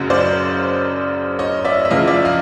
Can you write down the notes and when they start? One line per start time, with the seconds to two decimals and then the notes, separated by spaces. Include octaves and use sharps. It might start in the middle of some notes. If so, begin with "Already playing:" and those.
Already playing: F#1 F#2 C#3 F#3
0.10 C5 D5
1.39 C#5 D#5
1.64 D5 E5
1.85 E5
1.90 E2 C#3 F3 D#5 F5
2.07 D5 E5
2.25 D#5 F5